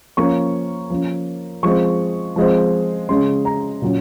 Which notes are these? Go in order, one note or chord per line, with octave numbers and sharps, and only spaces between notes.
F3 A#3 C#4 C#6
F3 A#3 C#4
F3 G#3 C4 C#6
F3 G#3 C4
C#3 G#3 C#4 C6
A#5
A#2 F#3 C#4